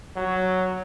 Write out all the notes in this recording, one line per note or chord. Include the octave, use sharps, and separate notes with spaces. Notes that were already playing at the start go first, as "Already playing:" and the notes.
F#3